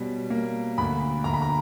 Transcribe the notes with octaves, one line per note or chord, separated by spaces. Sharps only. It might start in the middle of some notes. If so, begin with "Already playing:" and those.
Already playing: B2 G3 C#4
A#3
D2 B5
D2 A#5
B5
A#5